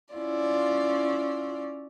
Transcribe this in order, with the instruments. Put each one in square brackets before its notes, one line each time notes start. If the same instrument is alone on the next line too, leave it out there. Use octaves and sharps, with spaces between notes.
[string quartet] C#4 E4 F4 D5